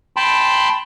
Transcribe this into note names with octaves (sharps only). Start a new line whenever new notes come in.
G5 A5 B5 C6